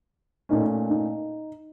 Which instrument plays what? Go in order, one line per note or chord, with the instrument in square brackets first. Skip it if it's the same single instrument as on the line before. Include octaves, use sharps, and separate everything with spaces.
[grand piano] A#2 A3 C#4 [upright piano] D#4
[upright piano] D#4